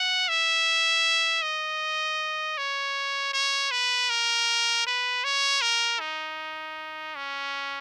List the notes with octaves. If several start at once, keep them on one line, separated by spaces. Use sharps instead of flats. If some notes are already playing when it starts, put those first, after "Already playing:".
Already playing: F#5
E5
D#5
C#5
C#5
B4
A#4
B4
C#5
A#4
D#4
C#4